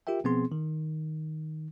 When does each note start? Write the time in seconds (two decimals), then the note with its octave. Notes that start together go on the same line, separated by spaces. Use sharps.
0.07 F4 G4 A#4 E5 G5
0.24 B2 F3 B3 C4 G#4 C6
0.52 D#3